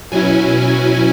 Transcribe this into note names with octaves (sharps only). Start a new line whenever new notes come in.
B2 F#3 C#4 E4 G#5